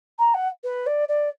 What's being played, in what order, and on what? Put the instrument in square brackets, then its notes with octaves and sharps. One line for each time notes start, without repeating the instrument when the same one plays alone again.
[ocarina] A#5
F#5
B4
D5
D5